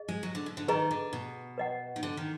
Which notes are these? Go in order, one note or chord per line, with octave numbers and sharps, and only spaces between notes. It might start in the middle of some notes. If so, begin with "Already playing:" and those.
Already playing: G#4 D#5
G#3
F#3
D3
B2
D3
D#3 G#4 B4 D#5 A#5
D3
B2
B4 D#5 F#5
D#3
D3
D#3